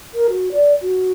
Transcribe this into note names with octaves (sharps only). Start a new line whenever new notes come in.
A#4
F#4
D5
F#4